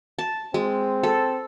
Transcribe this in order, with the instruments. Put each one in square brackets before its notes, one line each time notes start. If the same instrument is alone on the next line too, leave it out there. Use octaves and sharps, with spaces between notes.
[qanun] A5
[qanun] G#3 [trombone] C4
[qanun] A4